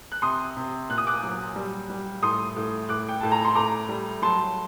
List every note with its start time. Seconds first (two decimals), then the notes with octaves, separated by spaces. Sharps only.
0.12 F#6
0.22 C3 C6 D#6
0.57 C3
0.89 A#2 F#6
0.98 D#6
1.07 D6 F#6
1.23 F#3
1.56 G3
1.90 G3
2.22 A2 C6 D#6
2.57 A2
2.89 A2 D6 F#6
3.09 G5
3.21 A2 A5
3.32 A#5
3.45 C6
3.55 A2 A#5 D6
3.89 G3
4.22 F#3 A5 C6